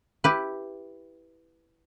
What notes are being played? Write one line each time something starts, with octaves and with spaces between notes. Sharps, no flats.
E4 G4 B4